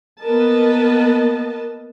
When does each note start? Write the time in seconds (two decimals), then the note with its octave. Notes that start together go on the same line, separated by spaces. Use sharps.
0.22 A#3 B3 A#4 B4 D#5 A5